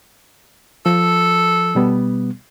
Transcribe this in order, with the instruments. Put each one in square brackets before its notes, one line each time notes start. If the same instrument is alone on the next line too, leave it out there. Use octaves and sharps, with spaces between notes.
[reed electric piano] F3 [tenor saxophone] A4
[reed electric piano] B2 G3 B3